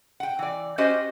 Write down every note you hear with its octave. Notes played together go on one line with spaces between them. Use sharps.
F#5 G5
E3 D5
C#4 F#4 G4 C5 D#5